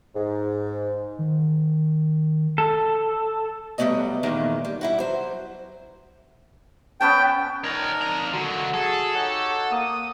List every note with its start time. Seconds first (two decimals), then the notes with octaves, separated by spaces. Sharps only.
0.15 G#2
1.19 D#3
2.58 A4
3.78 F#3 G3 A3 B3 D5 D#5
4.23 E2 A#2 D#3 G#3 A#3
4.65 G3
4.81 G3 E4 F#4
5.00 F#3 C5
7.01 B3 C#4 G5 A5
7.64 D4 D#4 A#4 C#5 D#5
8.02 F2 A#5
8.34 D3 F#3 F#4
8.74 G#4 A4
9.15 D#4 G4 C#5 F#5
9.71 A#3 D#6